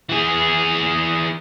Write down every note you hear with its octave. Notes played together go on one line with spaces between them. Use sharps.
E3 G#4